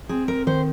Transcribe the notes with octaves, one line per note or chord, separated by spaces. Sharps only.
C4 G#4
A#4
D#3 C5